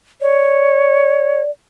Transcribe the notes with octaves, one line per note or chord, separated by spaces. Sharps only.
C#5 D5